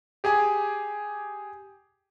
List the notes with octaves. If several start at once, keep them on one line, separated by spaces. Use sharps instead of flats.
G4 G#4 G5 G#5